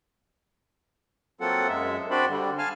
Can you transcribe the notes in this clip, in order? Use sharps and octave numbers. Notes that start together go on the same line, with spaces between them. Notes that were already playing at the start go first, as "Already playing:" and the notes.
F#3 A#3 C4 F4 A4 F#5
F#2 G#3 E5
C4 D4 F#4 C5 D5 B5
D3 G3
F5 G#5 A5 F6